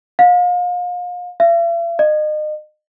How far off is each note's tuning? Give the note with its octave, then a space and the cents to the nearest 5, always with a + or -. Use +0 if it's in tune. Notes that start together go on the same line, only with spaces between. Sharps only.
F5 +35
E5 +45
D#5 -35